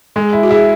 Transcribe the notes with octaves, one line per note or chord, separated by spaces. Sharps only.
G#3 G#4
E4
F#4
E4 G#4